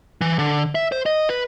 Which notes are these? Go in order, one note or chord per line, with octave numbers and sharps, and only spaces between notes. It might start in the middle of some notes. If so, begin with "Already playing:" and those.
E3
D3
E5
C5
D#5
B4